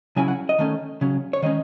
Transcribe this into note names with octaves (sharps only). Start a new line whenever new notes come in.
C#3 F#3 C#4 E4 G#5
F#5
D#5
D#3 A3 C#4
C#3 F#3 C#4
C#5
D#3 G#3 C#4 D#5